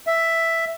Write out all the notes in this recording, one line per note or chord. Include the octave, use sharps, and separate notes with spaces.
E5